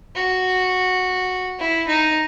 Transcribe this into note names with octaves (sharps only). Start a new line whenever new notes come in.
F#4
E4
D#4